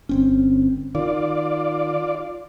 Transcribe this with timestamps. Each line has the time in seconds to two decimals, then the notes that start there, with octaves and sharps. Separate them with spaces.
0.09 G1 C4 C#4
0.95 D#3 F4 D5